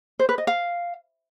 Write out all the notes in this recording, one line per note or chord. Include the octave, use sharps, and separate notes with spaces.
C5
B4
D#5
F5